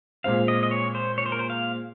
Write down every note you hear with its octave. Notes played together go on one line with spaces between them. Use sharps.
A#2 G#3 C4 F5
D#5
D#5
C#5
C5
C#5
C5
A#4
C5
F5